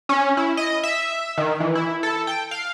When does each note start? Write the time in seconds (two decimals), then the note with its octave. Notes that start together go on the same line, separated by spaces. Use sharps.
0.09 C#4
0.37 E4
0.57 D#5
0.83 E5
1.38 D#3
1.60 E3
1.75 E4
2.03 A4
2.27 G5
2.51 F5